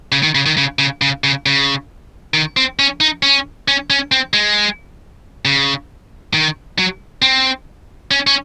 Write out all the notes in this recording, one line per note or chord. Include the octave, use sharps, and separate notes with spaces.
C#3
D#3
C#3
D#3
C#3
C#3
C#3
C#3
C#3
D#3
C4
C#4
D#4
C#4
C#4
C#4
C4
G#3
C#3
D#3
F#3
C4
C#4
C#4